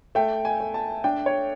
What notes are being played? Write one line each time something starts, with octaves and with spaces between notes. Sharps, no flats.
A3 G5
G#5
A3
A5
D4 G5
C#5